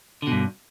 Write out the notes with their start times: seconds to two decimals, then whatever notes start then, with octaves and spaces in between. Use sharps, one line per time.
0.22 D3
0.27 B2
0.32 G2